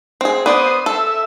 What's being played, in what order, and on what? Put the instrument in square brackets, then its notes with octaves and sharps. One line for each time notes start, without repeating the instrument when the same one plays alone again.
[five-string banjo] C4 G#4
[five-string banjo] B3 D5 [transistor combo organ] C5 D#6
[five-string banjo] A4 [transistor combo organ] E5